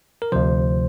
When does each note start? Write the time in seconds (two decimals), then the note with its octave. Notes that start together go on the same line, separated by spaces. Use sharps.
0.22 A#4
0.32 D2 C3 F3 C5